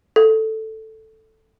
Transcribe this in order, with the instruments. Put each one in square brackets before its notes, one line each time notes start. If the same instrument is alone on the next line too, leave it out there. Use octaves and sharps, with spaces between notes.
[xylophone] A4